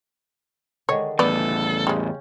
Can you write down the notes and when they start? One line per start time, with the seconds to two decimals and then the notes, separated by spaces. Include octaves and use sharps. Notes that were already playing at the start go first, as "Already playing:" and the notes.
0.89 D3 D#3 G#3 C#5
1.19 E2 A2 B3 A4 D5
1.87 C#3 G3 G#3 C#4 G5